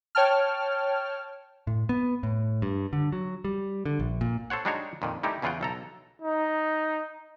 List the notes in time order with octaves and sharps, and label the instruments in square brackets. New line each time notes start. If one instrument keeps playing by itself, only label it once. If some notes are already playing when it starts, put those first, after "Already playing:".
[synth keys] C#5 G5 A5 F6
[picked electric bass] A2
B3
A2
G2
D3
F#3
G3
D3
A#1
A#2
[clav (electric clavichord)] A4 C5 C#5 F#5
G3 G#3 D4 D#4 F#4 C#5
F2 A#2 D#3
G3 A3 D#4 E4 G4
E2 C#3 E3 F4 F#5 G5
B1 A4 A#5
[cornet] D#4